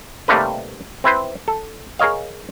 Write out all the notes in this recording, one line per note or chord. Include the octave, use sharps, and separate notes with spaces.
C3 G3 A3 A#3 D#4 B4
C4 E4 B4 C5
A4
G#4 A#4 C#5 D#5 F5